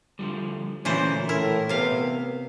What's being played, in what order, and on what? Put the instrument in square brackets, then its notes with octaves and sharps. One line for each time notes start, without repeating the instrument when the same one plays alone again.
[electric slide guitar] D3 F3 G3
[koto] A#2 E3 C5 [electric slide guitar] D3 A3 F#4 [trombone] C#4
[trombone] A2 [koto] E4 [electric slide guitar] A#4
[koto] C3 F5 [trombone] B3